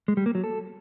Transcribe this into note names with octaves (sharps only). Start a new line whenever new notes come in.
G#3
G3
A#3
F#3
A4